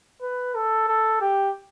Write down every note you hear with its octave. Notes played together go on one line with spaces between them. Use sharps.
B4
A4
A4
G4